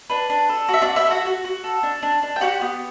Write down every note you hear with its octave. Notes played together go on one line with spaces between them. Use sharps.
D4 B4
D4
A4
F#4 E5
D4 D5
F#4
E4 E5
F#4 A4 F#5
F#4
F#4
A4
D4
D4
D4
G5
F#4 G4 F#5
B3